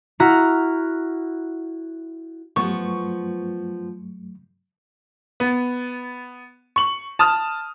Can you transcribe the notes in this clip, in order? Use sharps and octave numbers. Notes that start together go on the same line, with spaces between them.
E4 F#4 A#5 F6
G2 F3 F#3 A3 B3 C#6
B3
C#6 F#7
A5 D#6 F6